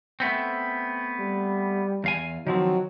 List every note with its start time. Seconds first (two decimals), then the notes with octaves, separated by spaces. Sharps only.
0.20 A3 B3 C4
1.20 G3
2.04 E2 F5 G#5
2.47 D#3 F3 F#3 C4